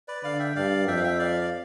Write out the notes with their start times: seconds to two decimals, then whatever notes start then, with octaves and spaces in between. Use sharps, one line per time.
0.08 B4 D5
0.23 D3 D5 F5
0.39 E5 G5
0.56 G2 D5 F5
0.87 F2 E5 G5
0.97 F5
1.03 E5 G5
1.19 D5 F5
1.41 D5